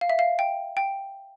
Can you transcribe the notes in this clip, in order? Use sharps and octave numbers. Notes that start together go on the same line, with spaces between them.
F5
E5
F5
G5
G5